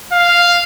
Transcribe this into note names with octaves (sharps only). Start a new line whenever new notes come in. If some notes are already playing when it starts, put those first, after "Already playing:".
F5